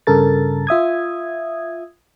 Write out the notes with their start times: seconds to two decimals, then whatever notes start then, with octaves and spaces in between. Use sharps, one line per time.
0.07 G2 C#3 A4 A#4 A6
0.67 F4 E5 D#6 G#6